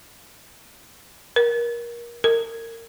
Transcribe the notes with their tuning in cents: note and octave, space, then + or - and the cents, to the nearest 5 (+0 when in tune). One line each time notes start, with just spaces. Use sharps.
A#4 +25
A#4 -25